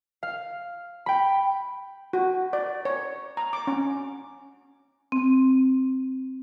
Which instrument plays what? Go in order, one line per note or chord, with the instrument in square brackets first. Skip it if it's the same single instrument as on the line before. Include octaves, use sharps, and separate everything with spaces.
[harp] F5
G5 B5
[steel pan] F#4
D5
C#5
A#5
D6
C#4
[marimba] C4